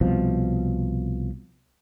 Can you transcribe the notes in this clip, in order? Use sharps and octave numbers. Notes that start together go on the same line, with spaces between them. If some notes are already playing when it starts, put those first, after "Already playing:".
C2 B2 F3